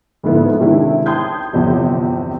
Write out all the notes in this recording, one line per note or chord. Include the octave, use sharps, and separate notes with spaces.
F2 G#2 D3 A3 B3 E4
C3 D#3 G#3 D4 E4
G5 A5 C6 D#6 G6 G#6
G1 E2 C3 F3